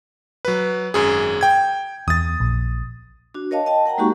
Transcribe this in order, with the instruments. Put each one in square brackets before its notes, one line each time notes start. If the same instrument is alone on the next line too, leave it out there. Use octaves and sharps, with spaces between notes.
[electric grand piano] F#3 B4
G#1 F#2 G#4
G5 G#6
[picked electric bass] E2 [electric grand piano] D#6 A6
[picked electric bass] A#1
[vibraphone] D4 F#4
A#4 C#5 D#5 F5 A5
D#5 G5 A5
A#4 F#5 G5 A#5
G#3 A#3 D#4 F#4 G4 C#6